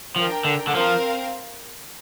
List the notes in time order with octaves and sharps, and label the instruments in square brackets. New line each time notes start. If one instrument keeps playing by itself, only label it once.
[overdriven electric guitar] F3 [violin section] D4 A#4 G5
[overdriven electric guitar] D3
D3
[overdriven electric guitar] F3 [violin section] C4 A#4 F5